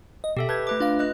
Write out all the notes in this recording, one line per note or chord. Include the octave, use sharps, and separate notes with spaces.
D#5
B2 G4 A4 E5
B4 A5 G6 G#6
A3 B4 D6
D4 F4 F5
B4 D#5 F#6